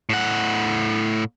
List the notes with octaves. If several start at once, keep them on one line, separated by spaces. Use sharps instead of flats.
A2 F#5